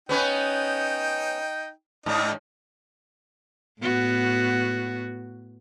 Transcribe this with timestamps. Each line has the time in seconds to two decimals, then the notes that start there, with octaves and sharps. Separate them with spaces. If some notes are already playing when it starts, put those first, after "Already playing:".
0.09 B3 C#4 D#4 B4 G5
2.06 G#2 D4 D#4
3.82 A2 B3 F#4